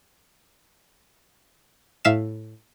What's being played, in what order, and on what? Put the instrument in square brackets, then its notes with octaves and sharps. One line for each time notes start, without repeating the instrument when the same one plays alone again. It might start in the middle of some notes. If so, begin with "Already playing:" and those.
[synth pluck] A2 E5 F5 E7